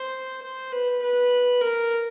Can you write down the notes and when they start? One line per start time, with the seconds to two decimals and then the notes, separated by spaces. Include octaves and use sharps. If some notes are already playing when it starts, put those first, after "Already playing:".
Already playing: C5
0.42 C5
0.72 B4
1.02 B4
1.62 A#4